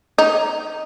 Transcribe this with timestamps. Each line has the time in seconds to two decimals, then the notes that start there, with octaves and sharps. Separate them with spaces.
0.18 D#4